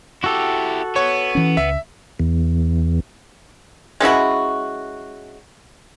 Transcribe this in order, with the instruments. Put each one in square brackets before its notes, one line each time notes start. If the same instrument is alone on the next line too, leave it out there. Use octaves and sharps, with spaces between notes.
[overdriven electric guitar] E4 G4 [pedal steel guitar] F#4 A4
[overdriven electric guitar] B3 [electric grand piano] C#5
[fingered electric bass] E3 C#4
[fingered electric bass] C#2 [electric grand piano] E5
[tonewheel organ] E2
[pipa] G#3 C#4 E4 F#4